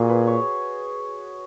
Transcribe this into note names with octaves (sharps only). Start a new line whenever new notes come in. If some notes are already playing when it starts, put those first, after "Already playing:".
Already playing: A#2 F#4 G#4
B4
C#5